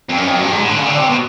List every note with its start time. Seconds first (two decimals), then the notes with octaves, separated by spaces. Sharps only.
0.09 F2
0.17 F#2
0.27 F2
0.35 F#2
0.43 G2
0.53 G#2
0.60 A2
0.69 D3
0.78 C#3
0.86 D3
0.97 C3
1.09 B2